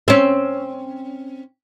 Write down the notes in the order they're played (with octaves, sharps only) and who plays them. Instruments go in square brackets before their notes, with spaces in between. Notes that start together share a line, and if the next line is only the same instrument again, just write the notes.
[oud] C4 C#4